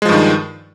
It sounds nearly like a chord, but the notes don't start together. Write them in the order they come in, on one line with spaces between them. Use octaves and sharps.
G#3 F3 G2 D#3